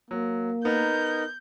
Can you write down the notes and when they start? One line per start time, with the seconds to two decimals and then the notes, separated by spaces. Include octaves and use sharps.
0.11 F#3 A#3
0.65 B3 D#4 A#4 G6